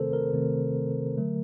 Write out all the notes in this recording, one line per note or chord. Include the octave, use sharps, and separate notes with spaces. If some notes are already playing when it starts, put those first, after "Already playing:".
Already playing: C3 D#3 A3 C4 A4 A#4 C5
A#4
C3 D#3 A3 C4
D3 F#3 A3